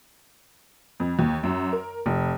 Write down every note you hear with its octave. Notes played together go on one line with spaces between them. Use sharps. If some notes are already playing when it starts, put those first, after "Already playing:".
F2
D#2
F#2
A#4
F1